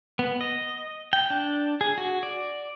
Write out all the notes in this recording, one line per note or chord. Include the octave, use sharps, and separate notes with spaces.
B3
D#5
G5
D4
G#4
F#4
D5